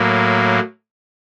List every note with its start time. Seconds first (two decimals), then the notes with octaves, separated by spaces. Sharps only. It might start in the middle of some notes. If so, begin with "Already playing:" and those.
Already playing: A2 F#3 A#3